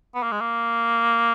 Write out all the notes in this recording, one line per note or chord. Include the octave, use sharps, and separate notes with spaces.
B3
A#3
G#3
A#3